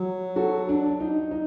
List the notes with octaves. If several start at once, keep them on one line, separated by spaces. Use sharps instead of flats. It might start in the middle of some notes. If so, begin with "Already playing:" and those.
Already playing: F#3
F#4 A4
D4
D#4
D#4